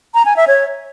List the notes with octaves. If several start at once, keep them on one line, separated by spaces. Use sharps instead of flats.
A#5
G#5
E5
C#5